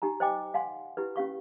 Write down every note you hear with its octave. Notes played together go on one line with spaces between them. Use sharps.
D#4 G4 G#5 A#5
C5 D#5 G5 G#5 D6
F5 F#5 G#5 C6
E4 G4 B4
C#4 G4 F5 C#6